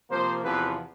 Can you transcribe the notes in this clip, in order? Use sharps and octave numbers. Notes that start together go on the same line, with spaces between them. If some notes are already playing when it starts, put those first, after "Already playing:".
C3 F3 A#3 C5
E2 C3 F3 B4